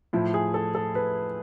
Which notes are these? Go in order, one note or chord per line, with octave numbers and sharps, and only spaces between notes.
A2 F3 E4
G#4
A4
A4
B4